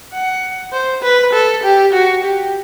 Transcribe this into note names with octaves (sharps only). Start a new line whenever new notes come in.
F#5
C5
B4
A4
G4
F#4
G4